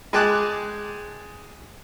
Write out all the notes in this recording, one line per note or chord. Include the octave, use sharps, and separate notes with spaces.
G#3 G#4 G5 A5 D6 F#6